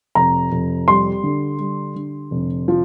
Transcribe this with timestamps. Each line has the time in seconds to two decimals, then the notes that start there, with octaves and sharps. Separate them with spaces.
0.15 F1 A#5
0.52 F1
0.88 G3 C6
1.23 D3
1.59 G3
1.96 D3
2.31 F1
2.68 F3